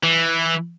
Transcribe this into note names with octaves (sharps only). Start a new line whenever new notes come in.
E3